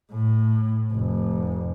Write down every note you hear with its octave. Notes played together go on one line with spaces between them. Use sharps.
A2
F1